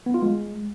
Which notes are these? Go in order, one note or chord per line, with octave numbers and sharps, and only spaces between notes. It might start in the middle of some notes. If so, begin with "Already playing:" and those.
B3
F4
G#3